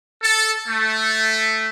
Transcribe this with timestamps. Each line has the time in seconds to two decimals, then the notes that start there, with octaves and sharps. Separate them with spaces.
0.22 A4
0.67 A3